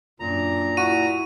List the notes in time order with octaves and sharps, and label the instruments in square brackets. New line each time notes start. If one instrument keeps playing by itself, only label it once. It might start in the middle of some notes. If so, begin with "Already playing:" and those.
[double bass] F#2 D4 [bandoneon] A#2 A#5
[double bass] E4 [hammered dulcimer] F#4 [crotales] D#7